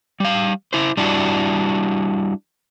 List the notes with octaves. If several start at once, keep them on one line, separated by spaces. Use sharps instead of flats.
G3 F5
E4 C5
G3 D4 E4 F#4